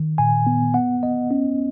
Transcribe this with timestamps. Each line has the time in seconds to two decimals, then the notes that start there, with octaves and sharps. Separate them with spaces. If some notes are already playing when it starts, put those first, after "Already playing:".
Already playing: D#3
0.18 A#2 G#5
0.47 B3
0.74 B3 F#5
1.03 B3 D#5
1.31 C#4